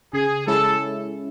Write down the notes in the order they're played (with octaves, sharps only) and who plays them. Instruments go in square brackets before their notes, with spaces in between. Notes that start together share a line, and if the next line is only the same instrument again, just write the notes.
[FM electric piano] C#3 [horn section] G#4
[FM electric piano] G#3 C#4 E4 [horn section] A4